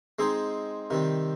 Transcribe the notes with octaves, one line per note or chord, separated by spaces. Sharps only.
G#3 C4 D#4 G#4 C5
C3 D#3 G3 C4